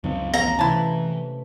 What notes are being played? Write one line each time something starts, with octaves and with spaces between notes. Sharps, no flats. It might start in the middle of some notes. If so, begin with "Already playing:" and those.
C#2 F#2 D#3 C4
A1 F2 B3 A#5
C3 E3 A3 E4 B4 A5